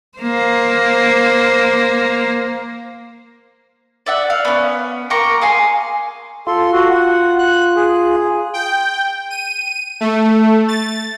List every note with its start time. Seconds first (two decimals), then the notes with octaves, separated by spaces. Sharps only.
0.18 A#3 C5
4.06 D5 E5 F#5
4.30 F5
4.45 B3 C#4
5.10 A#3 G5 A#5 C#6
5.41 G#4 F5 G#5 C6
6.47 F4 A4 C6
6.72 F#4
6.90 F#5
7.39 F#6
7.76 G#4
8.54 G5
9.30 D#7
10.00 A3
10.68 A6